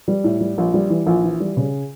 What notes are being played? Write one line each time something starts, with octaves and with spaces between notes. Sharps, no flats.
G3
A2
G3
A#1
G3
E3
A#1
E3
G3
C#3